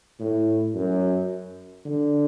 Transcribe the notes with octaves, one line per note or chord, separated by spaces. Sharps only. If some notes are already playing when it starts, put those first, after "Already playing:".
A2
F#2
D3